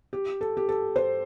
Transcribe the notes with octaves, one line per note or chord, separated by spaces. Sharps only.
G4
A4
G4
A4
C5